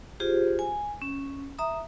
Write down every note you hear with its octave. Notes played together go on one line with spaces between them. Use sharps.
F4 G4 G#4 C5
G#5
C#4
E5 A#5 D#6